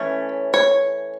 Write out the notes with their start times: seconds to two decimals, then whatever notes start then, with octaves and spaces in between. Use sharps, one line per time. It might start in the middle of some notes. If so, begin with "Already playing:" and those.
Already playing: E3 A3 C#4 C#5
0.54 C#5